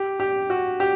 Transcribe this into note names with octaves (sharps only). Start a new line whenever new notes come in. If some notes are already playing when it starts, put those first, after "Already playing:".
Already playing: G4
G4
F#4
G4